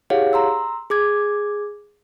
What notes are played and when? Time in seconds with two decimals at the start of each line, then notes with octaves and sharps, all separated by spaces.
0.10 E4 G4 G#4 C#5 F5 F#5
0.33 A#5 C6 E6
0.90 G#4 D6 G#6